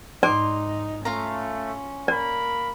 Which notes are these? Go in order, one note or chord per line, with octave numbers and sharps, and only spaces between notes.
G#2 D#4 D5 C6 D6
A3 C#4 F4 F5 A#5
A#3 A#4 D5 B5